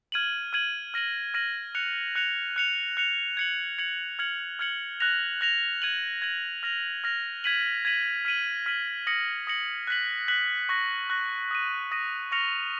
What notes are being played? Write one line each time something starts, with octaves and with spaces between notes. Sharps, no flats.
F6 G#6 D#7 F#7
F6 G#6 D#7 F#7
F6 A#6 D#7 F#7
F6 A#6 D#7 F#7
F#6 C#7 F7
F#6 C#7 F7
F#6 C#7 F7
F#6 C#7 F7
G#6 C#7 F#7
G#6 C#7 F#7
F6 G#6 C#7 F#7
F6 G#6 C#7 F#7
F#6 A#6 F7
F#6 A#6 F7
G#6 D#7 F#7
G#6 D#7 F#7
F6 A#6 F7
F6 A#6 F7
G#6 B6 D#7 F#7
G#6 B6 D#7 F#7
F6 B6 D#7 F#7
F6 B6 D#7 F#7
D#6 A#6 C#7 F#7
D#6 A#6 C#7 F#7
F#6 B6 F#7
F#6 B6 F#7
C#6 F#6 A#6
C#6 F#6 A#6
D#6 A#6 D#7
D#6 A#6 D#7
C#6 F6 A#6 C#7 F7